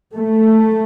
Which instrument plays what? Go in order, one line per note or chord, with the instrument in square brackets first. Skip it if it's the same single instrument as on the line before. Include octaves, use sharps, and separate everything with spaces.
[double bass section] A3